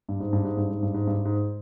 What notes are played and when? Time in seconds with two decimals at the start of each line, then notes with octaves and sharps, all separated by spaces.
0.09 G2
0.20 G#2
0.33 G2
0.45 G#2
0.57 G2
0.70 G#2
0.83 G2
0.94 G#2
1.07 G2
1.25 G#2